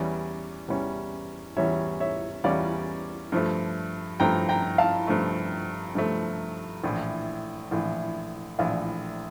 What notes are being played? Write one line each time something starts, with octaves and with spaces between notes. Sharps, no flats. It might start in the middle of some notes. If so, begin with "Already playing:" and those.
Already playing: E2 E3 G3 C#4 D5
E2 E3 G3 C#4
E2 E3 G3 C#4 C#5 E5
C#5 E5
E2 E3 G3 C#4 D5 F5
G2 F3 A3
G2 F3 A3 G5 A#5
G5 A#5
F5 A5
G2 F3 A3
G2 F3 A3
A#1 A2 E3
A#1 A2 E3
A#1 A2 E3 D5 F5